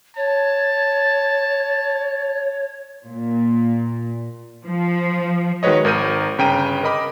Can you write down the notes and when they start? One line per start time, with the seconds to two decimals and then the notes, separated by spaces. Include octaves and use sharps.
0.17 C#5 A5
3.06 A#2
4.66 F3
5.63 D#3 G#3 F#4 B4 C#5 D#5
5.85 G#1 A#4 G6 D#7
6.38 G1 C#3 G5 A#5 D#7
6.83 A#4 D#5 B5 D6